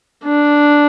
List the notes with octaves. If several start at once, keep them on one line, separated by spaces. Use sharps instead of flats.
D4